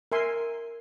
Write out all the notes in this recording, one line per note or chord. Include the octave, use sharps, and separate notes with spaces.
A#4 E5 G#5 C6